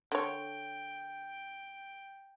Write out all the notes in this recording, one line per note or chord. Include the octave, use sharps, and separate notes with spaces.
D3 C#5 G5